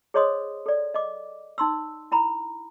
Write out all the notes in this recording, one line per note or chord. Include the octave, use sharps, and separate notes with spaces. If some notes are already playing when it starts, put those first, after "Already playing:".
G#4 C5 C#5 D#5 C6 D#6
A4 D5
D#5 D6
D#4 C6 E6
E4 A#5 B5